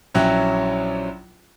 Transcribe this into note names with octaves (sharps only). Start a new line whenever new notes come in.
A#1 F#3 C#4 E4 G5 F#6